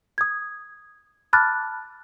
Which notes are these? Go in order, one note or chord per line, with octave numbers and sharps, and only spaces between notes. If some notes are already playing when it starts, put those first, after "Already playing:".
D#6 G#6
A5 B5 D6 F6 F#6 A6